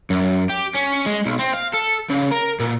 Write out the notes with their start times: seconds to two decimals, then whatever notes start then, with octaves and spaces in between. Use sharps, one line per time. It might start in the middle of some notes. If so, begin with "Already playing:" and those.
0.10 F#2
0.49 G4
0.75 C#4
1.06 G#3
1.26 B1
1.39 C4
1.54 F5
1.74 A4
2.10 C#3
2.32 A#4
2.60 A#2